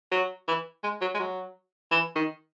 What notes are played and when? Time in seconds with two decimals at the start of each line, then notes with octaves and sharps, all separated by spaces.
0.12 F#3
0.48 E3
0.84 G#3
1.01 F#3
1.15 G#3
1.20 F#3
1.91 E3
2.15 D#3